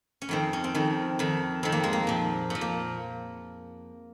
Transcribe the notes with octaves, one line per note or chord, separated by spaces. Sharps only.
C#4
F2 D#3 C4
C#4
C4
F2 D#3
F2 D#3
F2 D#3 C4
A#3
G#3
A#3
A#2 F3
A#2 F3
A#3